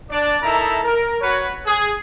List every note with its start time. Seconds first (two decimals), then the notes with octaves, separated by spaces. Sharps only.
0.10 D4 D5
0.42 D#4 E4 A4 A#4 E5 A#5
0.84 A#4
1.21 F#4 B4 C#5
1.66 G#4